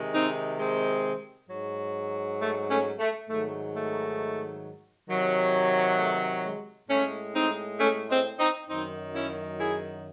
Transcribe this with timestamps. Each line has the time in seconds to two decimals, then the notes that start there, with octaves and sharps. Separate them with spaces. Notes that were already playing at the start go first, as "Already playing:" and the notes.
Already playing: C3 D#3 G#3
0.13 C4 D#4
0.58 G#3 C4
1.49 G#2 F#3
2.40 A3
2.69 A3 C#4
2.99 A3
3.29 G#2 D#3 F#3 A3
3.75 A3
5.09 C3 D#3 F#3
5.98 A3
6.44 G#3
6.89 A2 G#3 A3 C#4
7.34 C4 D#4
7.79 A3 C#4
8.09 G#3 C4
8.39 C4 D#4
8.68 F#2 D#3 F#3 C4 D#4
9.14 C#4 E4
9.59 E4 G#4